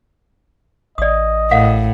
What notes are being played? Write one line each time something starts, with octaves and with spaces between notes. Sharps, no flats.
A1 D5 D#5 D#6
A2 A#4 F5 F#5